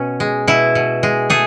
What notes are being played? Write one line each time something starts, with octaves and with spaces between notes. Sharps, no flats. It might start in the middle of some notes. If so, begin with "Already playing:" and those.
Already playing: B2 C#4
G#3
B2 E4
B2
G#3
A3 G#4